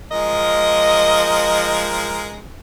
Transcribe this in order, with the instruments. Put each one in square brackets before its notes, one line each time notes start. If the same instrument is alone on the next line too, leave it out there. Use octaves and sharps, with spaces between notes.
[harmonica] F3 G#3 A#4 [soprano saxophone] D#5